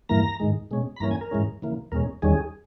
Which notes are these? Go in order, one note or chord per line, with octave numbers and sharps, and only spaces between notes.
G2 E3 A#3 A#5
G#2 D#3 G#3
B2 G#3 C#4
B5
G2 E3 A#3 C#4 A#5
G#5
A#4
G#2 E3 G#3 C#4
C#3 E3 A#3
E2 B2 G#3 C#4 A#4
E2 D#3 G3 C#4 G#4